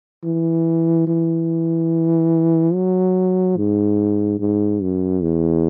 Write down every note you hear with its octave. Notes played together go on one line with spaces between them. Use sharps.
E3
E3
F#3
G#2
G#2
F#2
E2